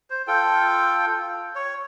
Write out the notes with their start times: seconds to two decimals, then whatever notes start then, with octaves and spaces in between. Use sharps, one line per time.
0.10 C5
0.27 F4 A4 G5
1.56 C#5